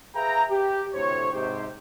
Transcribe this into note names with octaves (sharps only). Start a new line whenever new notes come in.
G#4 B4 E5 F5 G5 A#5
G4
D2 A2 C3 C5 C#5
G#2 C3 G4 C5